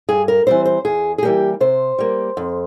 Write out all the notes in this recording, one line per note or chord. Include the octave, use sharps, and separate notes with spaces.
G2 G#4
A#4
E3 G3 C4 C5
C5
E2 G#4
G#4
E3 G3 A#3 G4
C3 C5
G3 A#3
F2